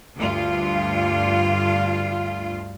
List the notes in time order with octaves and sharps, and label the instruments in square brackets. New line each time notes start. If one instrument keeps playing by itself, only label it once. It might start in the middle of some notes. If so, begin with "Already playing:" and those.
[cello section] D2 G2 F4